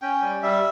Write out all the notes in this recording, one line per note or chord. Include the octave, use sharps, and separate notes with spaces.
C#4 G5
G3
G3 E5